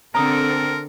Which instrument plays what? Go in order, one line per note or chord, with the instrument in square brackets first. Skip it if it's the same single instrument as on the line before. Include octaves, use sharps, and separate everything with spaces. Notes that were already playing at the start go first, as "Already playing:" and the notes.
[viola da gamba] D3 [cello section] C4 A4 [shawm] A#4 [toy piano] A#5 D#6